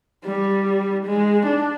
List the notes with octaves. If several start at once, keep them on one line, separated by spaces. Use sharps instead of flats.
G3
G#3
D4